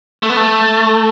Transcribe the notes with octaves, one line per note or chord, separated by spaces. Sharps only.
A3
B3
A3